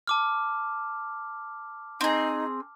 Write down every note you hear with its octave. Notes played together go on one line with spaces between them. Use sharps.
A5 D6 F6
C4 D#4 G#4